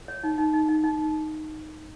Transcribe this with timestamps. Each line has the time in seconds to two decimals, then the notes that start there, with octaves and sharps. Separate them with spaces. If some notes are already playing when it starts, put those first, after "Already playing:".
0.08 C#5
0.23 D#4
0.38 D#4
0.53 D#4
0.68 D#4
0.84 D#4